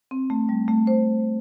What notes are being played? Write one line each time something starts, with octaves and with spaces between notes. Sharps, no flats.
C4
A3
G3
A3
C5